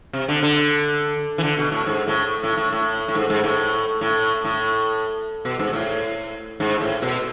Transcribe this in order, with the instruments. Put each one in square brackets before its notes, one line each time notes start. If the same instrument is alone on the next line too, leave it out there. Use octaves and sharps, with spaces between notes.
[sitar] C3
D3
D3
E3
D3
B2
A2
G#2
A2
A2
A2
A2
A2
G#2
G#2
A2
A2
A2
B2
G#2
A2
G#2
A2
B2